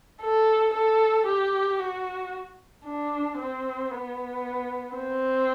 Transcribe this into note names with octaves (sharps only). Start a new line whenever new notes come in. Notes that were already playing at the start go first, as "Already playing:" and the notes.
A4
A4
G4
F#4
D4
C4
B3
C4